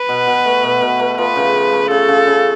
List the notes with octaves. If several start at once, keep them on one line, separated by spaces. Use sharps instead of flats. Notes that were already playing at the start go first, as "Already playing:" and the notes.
Already playing: B4
B2
B2
A3
B2
B2
A3
F3 B4
C#3
F3
A3
C#3 A4
C#3
C#3